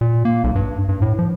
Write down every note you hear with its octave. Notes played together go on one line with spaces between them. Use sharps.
A#2
A#3
B1
G2
G2
A2
F3